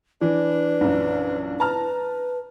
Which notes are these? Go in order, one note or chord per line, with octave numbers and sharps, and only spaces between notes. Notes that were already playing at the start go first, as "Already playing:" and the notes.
E3 D4 B4
A#1 F#2
B4 A5 A#5 F6